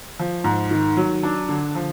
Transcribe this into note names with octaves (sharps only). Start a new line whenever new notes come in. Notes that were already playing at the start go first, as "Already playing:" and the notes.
F3
G#2
D#3
F#3
D4
D3
F3